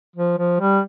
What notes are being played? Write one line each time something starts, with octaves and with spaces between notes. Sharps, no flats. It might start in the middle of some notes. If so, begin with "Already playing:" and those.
F3
F3
G3